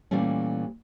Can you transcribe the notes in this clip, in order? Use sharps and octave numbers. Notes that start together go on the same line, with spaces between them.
A#2 E3 G3 A3 C#4